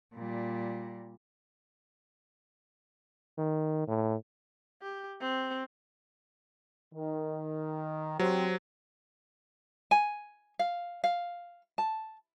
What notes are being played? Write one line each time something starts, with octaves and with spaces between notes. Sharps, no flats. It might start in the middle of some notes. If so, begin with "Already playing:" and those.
A#2 G3
D#3
A2
G4
C4
D#3
F#3 C4 G4 C5
G#5
F5
F5
A5